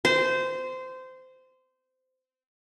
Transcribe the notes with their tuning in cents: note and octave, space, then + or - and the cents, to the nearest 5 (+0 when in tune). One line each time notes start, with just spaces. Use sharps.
C5 -20